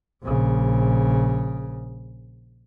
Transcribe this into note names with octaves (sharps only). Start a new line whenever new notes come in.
A#1 C#3